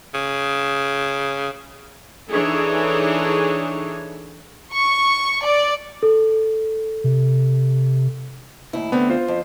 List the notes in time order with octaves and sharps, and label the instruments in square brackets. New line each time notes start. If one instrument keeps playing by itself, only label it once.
[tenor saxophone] C#3
[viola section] E3 D4 D#4 G#4 A4 C#5
[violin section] C#6
D5
[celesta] A4
[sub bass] C3
[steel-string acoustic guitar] D#2 A2 E4
[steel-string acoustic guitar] D3 A3 C4 [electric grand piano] B3
[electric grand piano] F4 C5
[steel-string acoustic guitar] F2